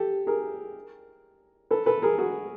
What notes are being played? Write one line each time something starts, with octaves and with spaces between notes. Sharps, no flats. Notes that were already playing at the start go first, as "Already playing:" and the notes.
Already playing: G4 A4
G#4 A#4
A4 B4
A4 B4
G#4 A#4
F#4 G#4